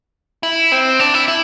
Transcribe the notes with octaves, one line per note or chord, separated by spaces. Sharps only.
E4
C4
D4
E4
E4